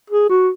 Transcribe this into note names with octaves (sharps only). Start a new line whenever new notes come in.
G#4
F#4